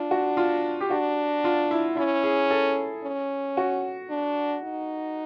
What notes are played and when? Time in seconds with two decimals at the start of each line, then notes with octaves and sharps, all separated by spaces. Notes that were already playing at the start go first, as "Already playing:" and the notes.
Already playing: D4 F4
0.11 F#4
0.37 F4
0.81 G4
0.90 D4 F#4
1.44 F4
1.71 E4
1.97 C#4 E4
2.24 G#4
2.51 A4
3.04 C#4
3.57 F#4
4.10 D4
4.64 D#4